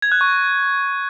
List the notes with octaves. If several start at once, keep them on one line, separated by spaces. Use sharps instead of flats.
G#6
F#6
C#6